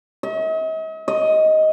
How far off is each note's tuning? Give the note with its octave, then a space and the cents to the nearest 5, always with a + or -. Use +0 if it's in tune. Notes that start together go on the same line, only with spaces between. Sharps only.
D#5 +45
D#5 +10